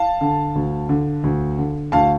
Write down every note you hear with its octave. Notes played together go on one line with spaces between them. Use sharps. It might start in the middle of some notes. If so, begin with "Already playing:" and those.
Already playing: F5 A5
D3
D2
D3
D2
D3
D2 F5 A5